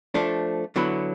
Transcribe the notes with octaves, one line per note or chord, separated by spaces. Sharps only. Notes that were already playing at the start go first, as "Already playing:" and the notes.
F3 A3 D4
D3 F#3 B3 E4